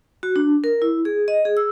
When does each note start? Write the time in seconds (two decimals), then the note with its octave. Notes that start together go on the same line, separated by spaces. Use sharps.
0.23 F#4
0.36 D4
0.64 A#4
0.82 E4
1.05 G#4
1.28 D#5
1.45 G#4
1.57 E6